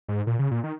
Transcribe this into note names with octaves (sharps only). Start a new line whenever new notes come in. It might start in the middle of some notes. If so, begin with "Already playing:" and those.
G#2
A#2
C#3
A#2
D#3